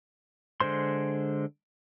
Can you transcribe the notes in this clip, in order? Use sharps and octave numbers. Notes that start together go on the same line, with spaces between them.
D3 G#3 C5 C6